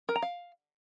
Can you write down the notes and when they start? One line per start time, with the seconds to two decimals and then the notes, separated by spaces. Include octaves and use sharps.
0.09 A#4
0.16 A#5
0.22 F5